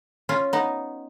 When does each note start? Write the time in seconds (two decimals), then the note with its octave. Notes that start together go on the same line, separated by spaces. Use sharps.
0.29 C#4 F4
0.53 B3 D#4